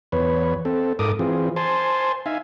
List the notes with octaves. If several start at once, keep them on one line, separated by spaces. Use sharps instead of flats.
E2 B4 C#5
C4 A4
G#2 A4 A#4 D6 D#6
E3 C4 F4 G#4
C5 G#5 A5 C6
D#4 E5 F5 G#5